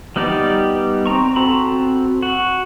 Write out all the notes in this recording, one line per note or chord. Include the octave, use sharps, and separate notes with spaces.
G3 B3 D#4 G4 D5
C4 A#5 C#6
C4 F#4 A4 A#5 B5
F#4